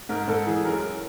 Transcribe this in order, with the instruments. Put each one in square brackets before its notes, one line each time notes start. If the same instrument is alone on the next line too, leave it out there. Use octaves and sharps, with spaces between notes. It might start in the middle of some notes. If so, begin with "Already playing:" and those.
[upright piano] G#2 A#4
G#2 A4
E3 G#4
F#2 A#4